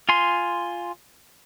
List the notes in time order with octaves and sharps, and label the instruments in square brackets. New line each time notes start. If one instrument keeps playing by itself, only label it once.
[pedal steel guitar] F4 G#5 C6